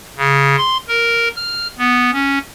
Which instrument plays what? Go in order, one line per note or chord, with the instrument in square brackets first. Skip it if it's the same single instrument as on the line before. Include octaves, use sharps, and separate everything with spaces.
[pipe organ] C#3
C6
A#4
F6
B3
C#4